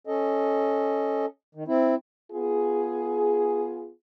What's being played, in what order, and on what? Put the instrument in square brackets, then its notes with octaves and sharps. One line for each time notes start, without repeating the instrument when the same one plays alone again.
[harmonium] C#4 A4 D#5
D#3
C4 E4
[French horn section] B3 F4 G#4